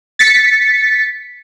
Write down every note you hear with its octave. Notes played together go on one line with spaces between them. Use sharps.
A6 B6 C#7